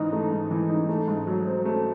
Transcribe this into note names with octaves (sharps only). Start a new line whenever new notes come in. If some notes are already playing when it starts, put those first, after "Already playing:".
Already playing: G#2 E3 D#4
A3
G#2
E3
D#4
A3
G#2
F#3
C4
A3